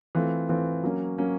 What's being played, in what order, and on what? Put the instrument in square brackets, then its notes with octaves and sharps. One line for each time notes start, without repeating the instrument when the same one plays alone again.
[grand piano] E3 A3 C4 F4
E3 A3 C4 F4
F#3 A#3 C#4
F#3 A#3 C#4